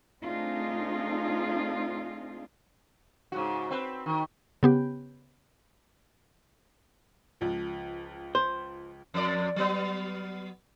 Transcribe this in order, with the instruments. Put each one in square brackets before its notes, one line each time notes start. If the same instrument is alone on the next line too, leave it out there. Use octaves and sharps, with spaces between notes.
[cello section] A3 C4 D4 D#4 F4 G#4
[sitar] G#2 C#3 F#4
C4 B4
D#3
[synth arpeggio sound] C#3 B3 G4
[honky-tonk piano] C#2 F3
[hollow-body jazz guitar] C5
[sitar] F2 D5
F#3 B3